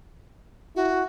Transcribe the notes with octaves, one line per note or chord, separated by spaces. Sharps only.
E4 F#4